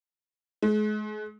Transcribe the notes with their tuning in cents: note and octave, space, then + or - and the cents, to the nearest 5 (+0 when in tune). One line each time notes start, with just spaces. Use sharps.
G#3 +40